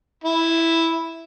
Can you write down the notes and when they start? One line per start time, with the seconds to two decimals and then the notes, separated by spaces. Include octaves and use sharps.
0.24 E4